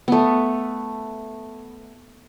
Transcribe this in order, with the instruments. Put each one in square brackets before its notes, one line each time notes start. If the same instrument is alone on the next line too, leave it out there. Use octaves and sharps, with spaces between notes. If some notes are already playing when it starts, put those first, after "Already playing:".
[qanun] A3 B3